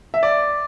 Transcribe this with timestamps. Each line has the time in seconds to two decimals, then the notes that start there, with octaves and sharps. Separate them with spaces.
0.14 E5
0.23 D5